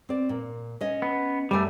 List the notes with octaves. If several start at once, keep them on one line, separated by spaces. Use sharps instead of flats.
C4 D5
A#2
C#4 D#5
B3
F#2 G3 A3 D5 G#5